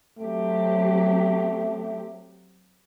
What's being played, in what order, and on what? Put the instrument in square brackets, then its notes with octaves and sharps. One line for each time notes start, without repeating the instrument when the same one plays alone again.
[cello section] F#3 C4 G4 [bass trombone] A3